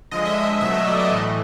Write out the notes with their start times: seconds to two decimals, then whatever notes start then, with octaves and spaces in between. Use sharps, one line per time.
0.11 D3 F3 G#3 D#5
0.25 E5
0.38 D#5
0.61 B2 F#3 A3 E5
0.74 D#5
0.88 D5
1.00 D#5
1.10 A2 E3 A3